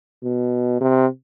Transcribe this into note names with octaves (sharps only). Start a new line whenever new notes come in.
B2
C3